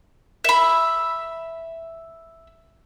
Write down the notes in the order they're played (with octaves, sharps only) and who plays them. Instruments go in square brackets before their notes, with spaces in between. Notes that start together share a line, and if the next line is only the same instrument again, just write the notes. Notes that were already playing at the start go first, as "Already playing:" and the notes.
[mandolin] E5 B5